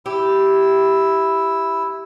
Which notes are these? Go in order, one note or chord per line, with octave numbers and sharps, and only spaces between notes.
E4 G4 E6